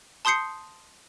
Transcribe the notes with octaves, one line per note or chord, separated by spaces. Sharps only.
A5 C6 D#6 G6 C7 C#7